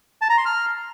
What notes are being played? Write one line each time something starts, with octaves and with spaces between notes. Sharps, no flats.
A5
A#5
C6
F6